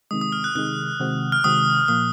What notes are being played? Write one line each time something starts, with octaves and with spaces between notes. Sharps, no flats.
C3 D#3 G#3 D#6
D#6
F6
F#6
C3 D#3 G#3 F#6
C3 D#3 G#3 C4 F#4
F6
C3 D#3 G#3 C4 F#4 D#6
A#2 F3 A#3 D#6